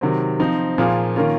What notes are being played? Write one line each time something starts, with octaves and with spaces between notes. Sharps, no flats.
C3 D#3 F#3 C4
F3 C4 D#4
A#2 F3 A#3 F4 G#4
D#3 A#3 C#4 F4